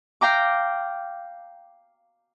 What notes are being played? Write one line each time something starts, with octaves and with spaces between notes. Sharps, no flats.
F5 G5 A#5 D6